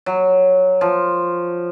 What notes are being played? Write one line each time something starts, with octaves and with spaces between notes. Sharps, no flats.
F#3
F3